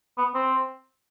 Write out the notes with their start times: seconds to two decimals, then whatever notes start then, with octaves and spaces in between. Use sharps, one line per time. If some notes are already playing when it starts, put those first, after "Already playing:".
0.18 B3
0.35 C4